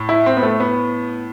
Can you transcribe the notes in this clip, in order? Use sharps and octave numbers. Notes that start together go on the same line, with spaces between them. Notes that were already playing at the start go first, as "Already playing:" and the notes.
Already playing: A2
E4
C4
B3
A3
B3